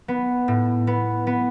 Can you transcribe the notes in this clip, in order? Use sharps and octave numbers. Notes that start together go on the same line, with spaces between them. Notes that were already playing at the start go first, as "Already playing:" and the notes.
B3
A2
B3
B3